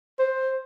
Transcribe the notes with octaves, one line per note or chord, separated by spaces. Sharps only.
C5